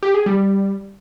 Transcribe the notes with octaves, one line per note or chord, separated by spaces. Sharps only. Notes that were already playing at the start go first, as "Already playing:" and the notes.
G4
G#4
G3